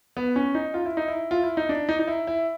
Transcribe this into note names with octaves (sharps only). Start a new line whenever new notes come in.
B3
C#4
D#4
F4
E4
D#4
E4
F4
E4
D#4
D4
D#4
D#4
E4
E4